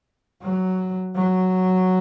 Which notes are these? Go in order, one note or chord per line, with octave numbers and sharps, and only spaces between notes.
F#3
F#3